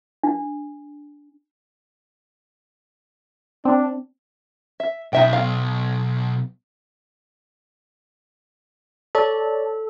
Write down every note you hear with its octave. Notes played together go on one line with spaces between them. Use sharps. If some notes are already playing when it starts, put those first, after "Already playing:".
D4
C4 D4
E5
B1 D#4 E5 G5
F5
A4 C#5 D5 A5